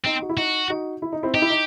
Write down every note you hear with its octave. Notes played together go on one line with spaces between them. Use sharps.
C4 D#4
F#4
E4
D#4 F#4
D#4 F#4
E4
D#4
C4 E4
D#4 G4
E4
D#4